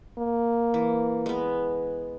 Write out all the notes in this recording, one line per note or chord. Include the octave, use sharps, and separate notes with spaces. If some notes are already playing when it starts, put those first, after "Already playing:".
A#3
E3
G#3 B3